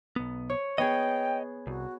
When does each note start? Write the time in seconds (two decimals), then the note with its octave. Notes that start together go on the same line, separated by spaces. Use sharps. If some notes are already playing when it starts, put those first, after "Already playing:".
0.16 B1 B3
0.50 C#5
0.78 B3 G#4 C#5 D#5 G5
1.67 C2 F#4